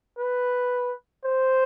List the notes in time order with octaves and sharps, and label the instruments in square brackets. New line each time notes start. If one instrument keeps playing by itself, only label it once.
[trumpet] B4
C5